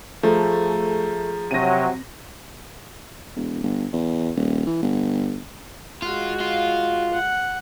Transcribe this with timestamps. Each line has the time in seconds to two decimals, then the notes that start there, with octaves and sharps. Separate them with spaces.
0.23 F3 A3 G#4 A#5
1.51 C3 F#3 C4 A#6 D#7
3.36 E1
3.63 G1
3.93 E2
4.36 D#1
4.66 E3
4.82 G1
6.02 G#3 F4 F#4
6.41 F4
7.13 F#5